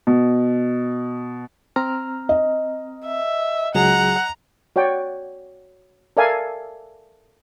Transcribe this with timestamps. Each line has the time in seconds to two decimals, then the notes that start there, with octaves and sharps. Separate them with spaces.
0.07 B2
1.76 C4 A#5 F6
2.29 D#5
3.05 E5
3.75 C#2 F#3 G#4 F#5 A#5
4.76 F#4 C#5 D5 G5
6.17 A4 A#4 D5 E5 F5 G#5